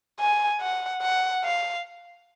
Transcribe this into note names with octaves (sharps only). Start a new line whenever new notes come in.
G#5
F#5
F#5
F5